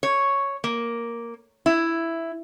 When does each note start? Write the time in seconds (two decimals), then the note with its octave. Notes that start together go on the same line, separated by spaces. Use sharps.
0.03 C#5
0.64 A#3
1.66 E4